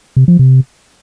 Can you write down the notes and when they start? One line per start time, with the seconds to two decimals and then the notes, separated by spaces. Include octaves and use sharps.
0.17 C3
0.28 F3
0.39 C3